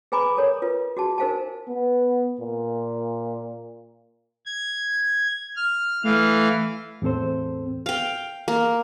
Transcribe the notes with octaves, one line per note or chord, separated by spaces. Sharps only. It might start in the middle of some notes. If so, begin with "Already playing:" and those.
G#4 B4 G#5 A#5 B5 D6
A4 A#4 C#5
F4 B4
F#4 G#4 A5
D#4 A#4 C5 F5 G#5 A5
B3
A#2
G#6
F6
E3 A3 F5
E2 A2 C4 A4 C5
F5 G5
A#3